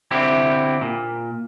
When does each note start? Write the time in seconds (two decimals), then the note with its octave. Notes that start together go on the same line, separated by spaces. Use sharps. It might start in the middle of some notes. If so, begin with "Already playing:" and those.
0.11 D3 C4 E4 G4
0.81 A#2